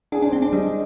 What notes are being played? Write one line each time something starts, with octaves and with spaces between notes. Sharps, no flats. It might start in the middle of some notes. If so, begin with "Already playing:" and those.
D4 G#4
D4
C5
C4
D5
D4
G3 D#5